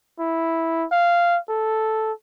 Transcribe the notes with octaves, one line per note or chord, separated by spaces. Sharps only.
E4
F5
A4